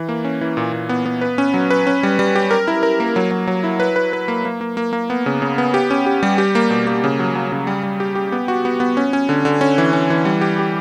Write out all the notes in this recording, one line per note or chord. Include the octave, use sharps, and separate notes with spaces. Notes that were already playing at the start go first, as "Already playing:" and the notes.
Already playing: E3
A#3
C#4
E3
A#2
A#2
B3
B3
B4
C#4
F#3
B4
C#4
G3
G3
G4
A#4
E4
A#4
A#3
F#3
F#3
F#3
E4
B4
B4
B4
A#3
A#3
A#3
A#3
A#3
B3
C#3
C#3
B3
G4
C#4
G4
G3
G4
A#3
B2
A#3
C#3
F#3
F#3
C#3
G3
G3
G4
G4
B3
F#4
B3
B3
C#4
C#4
D3
D3
C#4
E3
C#4
E3
G3
G4
G4